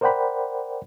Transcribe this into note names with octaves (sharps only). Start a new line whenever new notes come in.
A#4 C5 D5 F#5 G5 B5